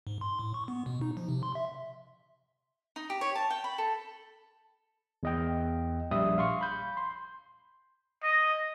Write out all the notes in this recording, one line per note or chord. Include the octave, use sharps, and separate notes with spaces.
G#2
C6
A2
C#6
B3
B2
D#4
F3
C3
C6
E5
D#4
G4
C#5
A5
G5
B5
A4
E2 D#5 G5
A#1 G3 E5 D#6
F5 C6 C#6
B5 G6
C6
D#5